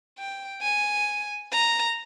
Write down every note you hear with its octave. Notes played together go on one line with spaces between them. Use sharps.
G5
G#5
A#5